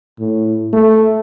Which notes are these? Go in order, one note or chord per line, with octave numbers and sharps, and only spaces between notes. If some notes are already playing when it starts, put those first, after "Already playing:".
A2
A3